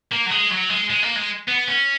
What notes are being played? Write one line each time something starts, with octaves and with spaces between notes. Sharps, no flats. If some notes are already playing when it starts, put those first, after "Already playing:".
A#3
F#3
G#3
F#3
G#3
G#3
A#3
G#3
B3
C#4